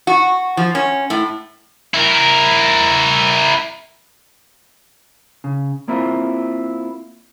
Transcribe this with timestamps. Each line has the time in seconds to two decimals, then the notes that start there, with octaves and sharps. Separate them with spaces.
0.07 F#4
0.57 F3
0.75 C#4
1.10 A2
1.94 E4 A#4
5.44 C#3
5.88 A#3 C4 E4 F4